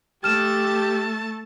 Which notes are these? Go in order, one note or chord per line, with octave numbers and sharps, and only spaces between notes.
A3 G4 A5 F6 E7